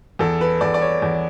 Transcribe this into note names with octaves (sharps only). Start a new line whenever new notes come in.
E2 A4
B4
E2 D5
D5
C#5
E2